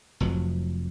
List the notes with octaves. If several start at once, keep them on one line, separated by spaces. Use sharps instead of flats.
F1 F2 F#3